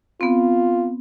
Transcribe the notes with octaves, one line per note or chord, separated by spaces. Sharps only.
B3 C4 F4